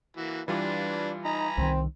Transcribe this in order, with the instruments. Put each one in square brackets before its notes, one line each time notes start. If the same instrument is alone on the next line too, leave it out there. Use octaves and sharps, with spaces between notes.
[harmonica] E3 A#3 F#4
[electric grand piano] E3 G3 F4 [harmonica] D4 B4
[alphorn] D#4 [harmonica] G#5 A#5 B5
[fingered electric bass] C2 D#3 [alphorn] C4